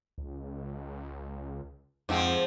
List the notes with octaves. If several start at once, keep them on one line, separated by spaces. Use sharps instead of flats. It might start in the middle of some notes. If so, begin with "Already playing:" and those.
C#2
F2 G#2 F3 C4